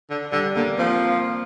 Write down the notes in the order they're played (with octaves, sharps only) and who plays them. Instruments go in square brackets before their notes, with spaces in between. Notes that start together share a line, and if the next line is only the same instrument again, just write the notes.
[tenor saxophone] D3
[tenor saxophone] D3 [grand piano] G3
[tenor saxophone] D3 [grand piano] A#3
[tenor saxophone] F3 [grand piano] C4